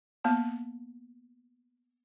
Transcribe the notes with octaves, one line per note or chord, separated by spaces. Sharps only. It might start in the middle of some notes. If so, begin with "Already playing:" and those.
A#3 B3 A5